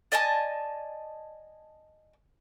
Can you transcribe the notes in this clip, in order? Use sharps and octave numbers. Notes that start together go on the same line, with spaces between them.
D5 D#5 G#5 A5